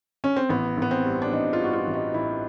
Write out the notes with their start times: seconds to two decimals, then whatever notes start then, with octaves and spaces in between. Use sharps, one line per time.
0.24 C#4
0.36 C4
0.49 A1 B3
0.77 A1 B3
0.91 C4
1.05 G2
1.22 D4
1.32 A1 D#4
1.53 F4
1.60 G2 F#4
1.73 F4
1.87 A1
1.94 D#4
2.14 A1 E4